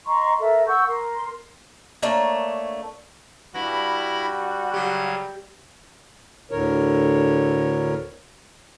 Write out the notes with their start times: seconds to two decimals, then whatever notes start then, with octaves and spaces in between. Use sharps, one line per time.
0.07 D#5 A#5 C6 C#6
0.40 A4 A#4 E5
0.67 F#5 C#6 E6 G6
0.88 A#4 C6
2.02 A3 A#3 D4 C#5
3.54 G2 G3 E4 F#4 B5 A#6
4.74 C#3 F#3 G4 G#6
6.51 D2 A2 D3 A#4 C#5